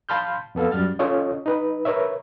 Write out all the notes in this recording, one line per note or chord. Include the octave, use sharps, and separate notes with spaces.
F5 A5 B5 C6 F6 G6
F2 B3 A4 F5
F#2 G3 F6 A6
C#4 F4 A4 C#5 D#5
D#4 B4
A#4 B4 C#5 E5